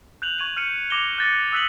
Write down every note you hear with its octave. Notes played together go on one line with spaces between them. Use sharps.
F#6 G6 F7 F#7
C#6 G#6 D#7 F7 F#7
F6 G6 C#7 D#7
D6 A#6 F7 G7
F#6 G6 A6 A#6 C#7
D#6 E6 F#6 B6 D#7 F#7